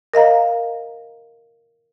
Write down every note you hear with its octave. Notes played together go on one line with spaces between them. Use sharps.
A#4 D#5 F5 A#5